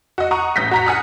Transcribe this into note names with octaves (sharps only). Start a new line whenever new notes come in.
F#4 D#5
F#5 A#5 C#6 D#6 F#6
A1 G6 A#6 B6
F#4 A#5 B6
F#5 G#5 A#5 D#6 F6 F#6